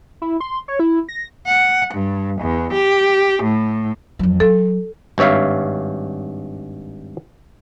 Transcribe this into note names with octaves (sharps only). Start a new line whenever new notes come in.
E4
C6
C#5
E4
A#6
F#5
G2
E2
G4
A2
F2 F#3
F#3 A4
G#1 G2 C#5 E5 F5